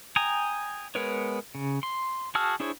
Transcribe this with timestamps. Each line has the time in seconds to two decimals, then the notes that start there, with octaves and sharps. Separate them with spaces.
0.16 G5 G#5 A#5 D#6
0.95 G#3 B3 A#4 B4 C#5
1.55 C#3
1.83 C6
2.35 F#4 G#4 A5 E6 F6
2.60 D4 E4 G#4 C5 C#5